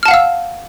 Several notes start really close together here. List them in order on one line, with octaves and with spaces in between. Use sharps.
F6 A5 F#5 F5 E6